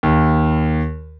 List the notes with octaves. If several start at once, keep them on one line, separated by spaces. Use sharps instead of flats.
D#2